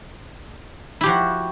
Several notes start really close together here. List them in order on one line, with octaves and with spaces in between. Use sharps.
E4 G4 F3 F#4